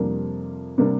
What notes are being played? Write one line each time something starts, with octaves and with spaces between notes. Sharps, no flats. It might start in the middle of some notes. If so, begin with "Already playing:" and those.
Already playing: F2 C3 G3 A#3 D4
C3 G3 A#3 D4